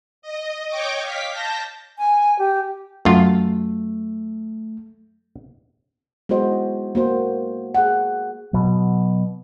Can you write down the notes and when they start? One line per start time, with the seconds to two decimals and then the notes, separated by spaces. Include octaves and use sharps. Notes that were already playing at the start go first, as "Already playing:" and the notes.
0.22 D#5
0.69 C#5 D#5 G5 C#6 D6
1.01 F5 B6
1.33 A5 G6 A#6
1.98 G#5
2.39 G4
3.05 F#2 A3 F4
6.29 G#3 B3 E4 F#4 C5 D#5
6.95 A#3 F#4 C5
7.75 G#4 F#5
8.53 B2 F#3